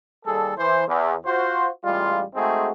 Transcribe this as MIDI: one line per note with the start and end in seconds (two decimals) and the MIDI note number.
0.25 0.53 39
0.25 0.53 55
0.25 0.53 68
0.25 0.53 69
0.58 0.84 52
0.58 0.84 72
0.88 1.14 40
1.26 1.67 65
1.26 1.67 66
1.26 1.67 72
1.84 2.22 33
1.84 2.22 55
1.84 2.22 56
1.84 2.22 65
2.35 2.71 56
2.35 2.71 57
2.35 2.71 60
2.35 2.71 63
2.35 2.71 66
2.35 2.71 68